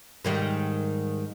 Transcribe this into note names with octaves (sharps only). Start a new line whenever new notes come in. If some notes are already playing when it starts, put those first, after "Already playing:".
G#2 D#3 G3